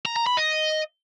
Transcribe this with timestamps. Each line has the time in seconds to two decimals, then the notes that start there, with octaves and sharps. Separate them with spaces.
0.06 A#5
0.16 A#5
0.27 B5
0.37 D#5